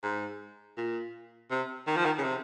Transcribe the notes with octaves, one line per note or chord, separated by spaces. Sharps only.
G#2
A#2
C3
D#3
F3
D#3
C#3
C3